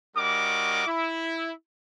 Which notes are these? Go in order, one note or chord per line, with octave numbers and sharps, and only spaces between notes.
G3 C#4 F#4 A#4 D#5 D6
E4